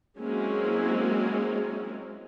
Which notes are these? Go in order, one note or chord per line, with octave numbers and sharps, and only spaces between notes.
F#3 G#3 A#3 C4 C#4 E4